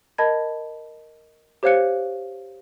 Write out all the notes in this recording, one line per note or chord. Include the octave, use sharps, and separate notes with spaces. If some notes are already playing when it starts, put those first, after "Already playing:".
A#4 D#5 A5 B5 G#6
G4 C5 C#5 F5 F#6 C#7